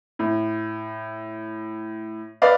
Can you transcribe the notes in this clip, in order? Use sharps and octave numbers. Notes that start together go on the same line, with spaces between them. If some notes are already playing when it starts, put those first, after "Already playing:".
A2
B4 D5 D#5 F5